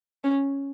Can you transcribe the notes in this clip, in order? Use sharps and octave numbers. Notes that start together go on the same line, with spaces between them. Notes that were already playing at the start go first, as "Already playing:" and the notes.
C#4